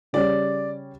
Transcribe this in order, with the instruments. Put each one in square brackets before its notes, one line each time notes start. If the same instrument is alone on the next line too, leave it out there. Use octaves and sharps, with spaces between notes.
[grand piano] C#3 G3 C#4 [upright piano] D5